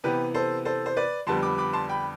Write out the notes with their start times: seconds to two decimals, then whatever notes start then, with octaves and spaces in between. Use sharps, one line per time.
0.04 C3 E3 B3 G4 B4
0.34 A4 C5
0.65 A4 C5
0.86 C5
0.97 B4 D5
1.27 F2 D3 G3 B3 A5 C6
1.43 B5 D6
1.58 B5 D6
1.73 A5 C6
1.89 G5 B5